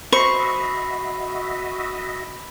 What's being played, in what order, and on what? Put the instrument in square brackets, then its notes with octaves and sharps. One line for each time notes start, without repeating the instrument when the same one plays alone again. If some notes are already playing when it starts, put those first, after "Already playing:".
[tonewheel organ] F#4 D#5 E5 [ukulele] C5 [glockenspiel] B5 C7 [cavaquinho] C#6